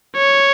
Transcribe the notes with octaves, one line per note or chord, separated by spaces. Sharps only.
C#5